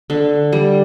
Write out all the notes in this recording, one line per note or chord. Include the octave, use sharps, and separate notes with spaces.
D3
G3